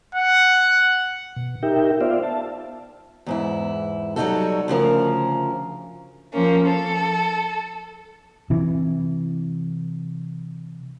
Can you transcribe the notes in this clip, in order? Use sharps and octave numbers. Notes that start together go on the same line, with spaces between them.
F#5
B2
D#4 G4 A#4 E5 G5
B3 F4 C5 D5 E5 F5
E5 A5
E2 G#2 E4
F#3 G3 C#4 D#4 F#4 A4
D2 C#3 F3 A#4
F3 A#3 C#4
A4
C3 E3